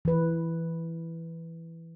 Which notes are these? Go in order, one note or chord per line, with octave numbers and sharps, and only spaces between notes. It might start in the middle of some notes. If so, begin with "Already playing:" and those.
E3 B4